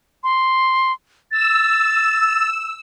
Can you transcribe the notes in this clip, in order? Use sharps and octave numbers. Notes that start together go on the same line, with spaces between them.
C6
E6 A6